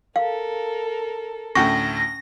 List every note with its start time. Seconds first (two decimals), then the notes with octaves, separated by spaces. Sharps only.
0.16 A4 A#4 F5
1.55 D2 A2 C#4 C#6 A#6